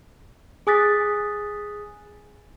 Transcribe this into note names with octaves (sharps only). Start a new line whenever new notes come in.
G#4 G#5 D#6 F#6 A6 B6